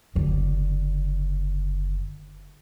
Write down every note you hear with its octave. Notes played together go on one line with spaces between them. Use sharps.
F#1 D3